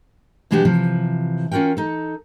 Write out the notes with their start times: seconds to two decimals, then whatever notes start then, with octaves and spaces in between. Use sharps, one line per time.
0.51 B2 E3 G#3 D4 F#4 G4
0.65 C3 E3 F3
1.51 C#4 F4 F#4 A#4 G5
1.77 D#4 A4